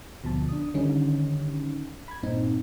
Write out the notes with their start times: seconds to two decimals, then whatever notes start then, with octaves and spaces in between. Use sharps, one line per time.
0.24 D2 B2 F3 A5
0.49 D4 D#6
0.74 D3 D#3 G3 C#4 D#4
2.08 B5 G#6
2.23 G2 A#2 C4 D#4